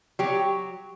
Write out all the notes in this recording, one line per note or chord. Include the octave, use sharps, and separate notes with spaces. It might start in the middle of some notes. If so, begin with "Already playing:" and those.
F#3 G4